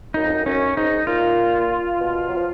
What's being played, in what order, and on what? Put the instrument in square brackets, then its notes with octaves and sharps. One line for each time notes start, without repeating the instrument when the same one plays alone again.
[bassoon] F#2 [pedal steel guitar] D#4
[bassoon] F2
F#2
[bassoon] F#2 [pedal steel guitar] C#4
[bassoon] G#2 [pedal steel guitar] D#4
[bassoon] A#2 [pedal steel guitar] F4
[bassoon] B2
F#3
F3